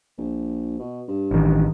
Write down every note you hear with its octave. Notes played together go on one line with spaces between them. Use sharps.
A#1
B2
G2
A1 D#3